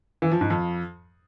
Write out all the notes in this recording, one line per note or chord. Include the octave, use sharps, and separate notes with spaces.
E3
F3
G#2
F2